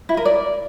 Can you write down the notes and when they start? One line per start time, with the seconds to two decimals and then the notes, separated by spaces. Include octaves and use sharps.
0.09 E4
0.17 A#4
0.25 D5